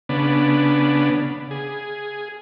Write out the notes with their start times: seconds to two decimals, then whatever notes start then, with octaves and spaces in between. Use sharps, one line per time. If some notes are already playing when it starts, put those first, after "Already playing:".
0.09 C#3 B3 D4
1.51 G#4